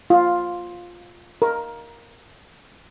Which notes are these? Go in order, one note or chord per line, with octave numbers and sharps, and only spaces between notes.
F4
A#4